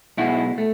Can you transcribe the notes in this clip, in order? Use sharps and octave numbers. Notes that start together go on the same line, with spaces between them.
B1 B2 G#3 E4 F#4
A3